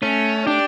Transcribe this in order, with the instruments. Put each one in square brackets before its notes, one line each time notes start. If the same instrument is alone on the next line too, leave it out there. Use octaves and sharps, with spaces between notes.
[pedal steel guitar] A3 [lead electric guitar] C#4
[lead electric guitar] D4 [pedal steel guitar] G4